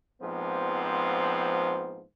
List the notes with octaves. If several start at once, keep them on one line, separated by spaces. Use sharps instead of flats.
A#1 G#2 F3 B3 C4